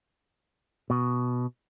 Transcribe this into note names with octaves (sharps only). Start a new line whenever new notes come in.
B2